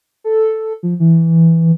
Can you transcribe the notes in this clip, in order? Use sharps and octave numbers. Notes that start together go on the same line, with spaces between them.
A4
F3
E3